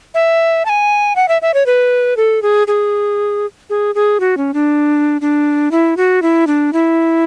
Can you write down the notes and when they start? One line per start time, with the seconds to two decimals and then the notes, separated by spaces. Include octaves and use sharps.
0.14 E5
0.65 A5
0.69 G#5
1.16 F#5
1.28 E5
1.42 E5
1.54 C#5
1.66 B4
2.17 A4
2.42 G#4
2.68 G#4
3.70 G#4
3.95 G#4
4.20 F#4
4.37 C#4
4.54 D4
5.21 D4
5.71 E4
5.97 F#4
6.22 E4
6.47 D4
6.73 E4